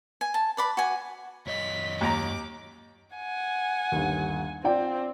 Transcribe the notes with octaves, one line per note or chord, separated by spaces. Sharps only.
G#5
A5
B4 D5 B5
F#4 G#5
F#2 C#5 D#5 B6
D#2 A#5 D6
F#5 G#5
G1 D#2
C4 F4 D5 G5